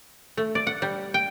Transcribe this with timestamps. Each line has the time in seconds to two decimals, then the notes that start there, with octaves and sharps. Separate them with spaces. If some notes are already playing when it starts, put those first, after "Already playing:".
0.37 A3
0.55 D5
0.67 F#5
0.82 G3
1.14 G5